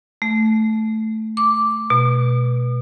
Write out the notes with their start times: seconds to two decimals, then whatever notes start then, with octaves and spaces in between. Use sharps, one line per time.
0.22 A3
1.37 D6
1.90 B2